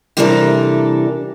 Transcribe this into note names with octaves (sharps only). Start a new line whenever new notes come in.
C3 E3 G3 D4 A4 A#4